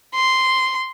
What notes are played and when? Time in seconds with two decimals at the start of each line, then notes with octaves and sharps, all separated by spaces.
0.15 C6